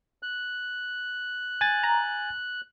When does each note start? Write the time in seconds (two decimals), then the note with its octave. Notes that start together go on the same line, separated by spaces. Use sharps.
0.23 F#6
1.61 G#5 A6
1.83 A#5